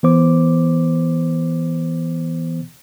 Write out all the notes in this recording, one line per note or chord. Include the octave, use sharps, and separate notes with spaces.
E3 B3 C5 D6